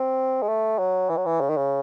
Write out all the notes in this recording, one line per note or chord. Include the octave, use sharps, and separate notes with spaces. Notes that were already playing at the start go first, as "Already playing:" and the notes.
Already playing: C4
G#3
A3
F#3
E3
F#3
E3
C#3
D#3
C#3